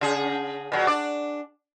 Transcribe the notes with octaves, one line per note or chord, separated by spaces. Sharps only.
C#3 G#4
A#2 F#3
D4 D5